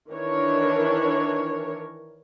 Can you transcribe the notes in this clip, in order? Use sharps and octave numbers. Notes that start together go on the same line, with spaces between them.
D#3 E3 D4 A#4 C#5